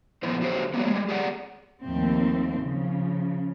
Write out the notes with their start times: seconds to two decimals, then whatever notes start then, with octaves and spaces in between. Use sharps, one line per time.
0.23 F2 A#2 B3 E4 C5
0.41 D3 F#3 F#4 G4 C5
0.74 F#3 G3 A#3 B3
0.87 G3 G#3
1.08 G4 G#4 D5 D#5 F#5
1.81 D#2 A2 F3 C4
2.60 C#3 F3